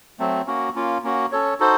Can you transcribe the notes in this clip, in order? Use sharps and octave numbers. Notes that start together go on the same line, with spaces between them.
F#3 A3 C4
A#3 C#4 F#4
A#3 C#4 F4
A#3 C#4 F#4
C#4 A4 C#5
D#4 F#4 A4 C5